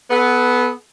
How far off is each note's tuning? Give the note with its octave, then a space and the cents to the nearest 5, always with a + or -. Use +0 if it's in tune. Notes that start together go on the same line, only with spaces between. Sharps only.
B3 +0 A4 -35